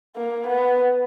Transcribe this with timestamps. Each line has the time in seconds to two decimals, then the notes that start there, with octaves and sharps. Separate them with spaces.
0.17 A#3
0.47 B3